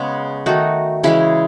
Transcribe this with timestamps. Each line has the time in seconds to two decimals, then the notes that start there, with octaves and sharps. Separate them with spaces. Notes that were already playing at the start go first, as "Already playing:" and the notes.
Already playing: C#3 G#3 B3
0.46 D#3 A3 D#4 F#4
1.04 C#3 E3 G#3 E4 G#4